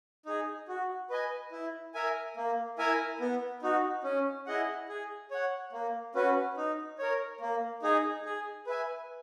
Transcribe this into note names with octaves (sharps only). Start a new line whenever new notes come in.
D#4 G#4
F#4
B4 D#5 G#5
E4
A#4 E5 G#5
A#3
E4 A#4 E5 G#5
B3
D#4 F#4
C#4
E4 G#4 D#5 F#5
G#4
C#5 F#5
A#3
C#4 F#4 B4
D#4
A#4 C#5
A#3
D#4 G#4
G#4
B4 E5 G#5